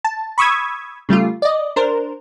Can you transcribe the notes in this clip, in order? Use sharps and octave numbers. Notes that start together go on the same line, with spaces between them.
A5
B5 C#6 D#6 E6 G#6
C#3 G3 A3 F4
D5 D#5
D4 A#4 C5